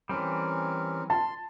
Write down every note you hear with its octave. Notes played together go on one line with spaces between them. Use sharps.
E3 G3 C4 C#4 A#4
A5 C6